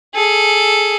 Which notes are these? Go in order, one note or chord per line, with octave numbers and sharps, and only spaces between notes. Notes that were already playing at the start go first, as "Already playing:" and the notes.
G#4 A4